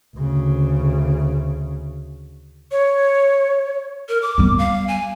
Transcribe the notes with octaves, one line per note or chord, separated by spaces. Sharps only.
D2 C#3
C#5
A#4
D6
G3 B3
F5
G#5